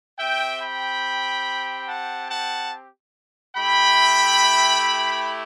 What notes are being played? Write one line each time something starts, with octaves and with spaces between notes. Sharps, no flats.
C4 G4 E5 G5
G5 B5
F#5 A5
F#5 A5
A3 E4 G4 G5 B5